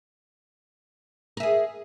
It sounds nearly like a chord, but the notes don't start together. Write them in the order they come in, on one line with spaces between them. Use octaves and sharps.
A#4 E5 G#4